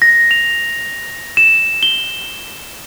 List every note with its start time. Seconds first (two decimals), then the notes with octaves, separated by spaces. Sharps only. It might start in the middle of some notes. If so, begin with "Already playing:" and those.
0.02 A#6
0.31 F7
1.37 E7
1.83 G7